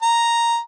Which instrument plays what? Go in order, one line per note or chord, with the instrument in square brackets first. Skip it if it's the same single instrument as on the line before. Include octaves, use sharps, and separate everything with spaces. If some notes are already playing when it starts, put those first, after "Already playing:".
[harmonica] A#5